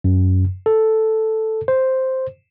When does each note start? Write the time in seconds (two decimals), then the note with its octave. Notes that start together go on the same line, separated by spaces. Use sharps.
0.04 F#2
0.66 A4
1.68 C5